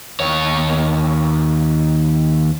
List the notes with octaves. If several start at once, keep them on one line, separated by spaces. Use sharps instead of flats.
D#2 C#5